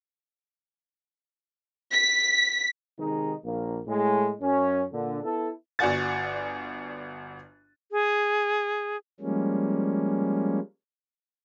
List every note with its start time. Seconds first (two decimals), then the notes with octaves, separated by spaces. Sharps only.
1.92 B6
2.98 C3 D#3 G#3 D#4
3.44 A#1 A#3
3.86 A2 G#3
4.41 F#2 C#4
4.92 A#2 D3
5.23 B3 E4 A4
5.79 G1 F#4 D5 F#5 G#5 A6
7.92 G#4
9.20 F3 G3 G#3 A#3 C#4